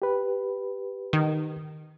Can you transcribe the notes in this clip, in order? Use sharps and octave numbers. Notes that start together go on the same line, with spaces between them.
G4 B4
D#3